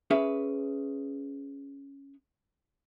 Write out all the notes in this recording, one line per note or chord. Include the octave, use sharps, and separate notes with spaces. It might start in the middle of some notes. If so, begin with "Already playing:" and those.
C#4 G#4 B4 E5